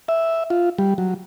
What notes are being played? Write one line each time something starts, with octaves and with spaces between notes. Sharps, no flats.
E5
F4
G3
F#3